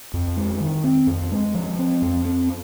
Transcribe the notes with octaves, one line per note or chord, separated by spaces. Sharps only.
F2
G#3
D#3
C4
F2
G#3
F3
C4
F2
C4